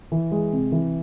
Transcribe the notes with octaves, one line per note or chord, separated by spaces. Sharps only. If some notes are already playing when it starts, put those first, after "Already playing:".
E3
G#3
C3
E3